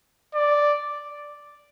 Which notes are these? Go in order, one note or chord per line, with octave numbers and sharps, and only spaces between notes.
D5